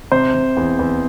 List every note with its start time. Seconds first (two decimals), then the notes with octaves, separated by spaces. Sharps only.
0.12 C3 C5
0.34 C3
0.57 E2
0.79 E2